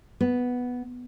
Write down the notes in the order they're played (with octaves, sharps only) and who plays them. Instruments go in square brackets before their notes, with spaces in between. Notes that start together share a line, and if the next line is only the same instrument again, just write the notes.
[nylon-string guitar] B3